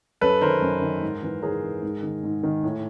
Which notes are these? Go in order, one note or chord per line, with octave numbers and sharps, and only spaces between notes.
F#2 A4 B4
D#3 A#4 C5
F#2
D#3
G#2
E3
G#2 G#4 A#4
E3
G#2
D#3
G#2
D#3
A2